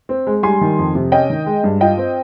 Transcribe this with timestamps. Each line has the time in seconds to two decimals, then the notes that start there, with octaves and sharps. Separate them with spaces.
0.09 C4
0.27 G#3
0.43 G3 G#5 C6
0.61 D#3
0.79 F2
0.95 C3
1.12 C#4 D#5 G5
1.30 D#3
1.46 G#3
1.64 G2
1.81 F4 D#5 G5
1.97 C4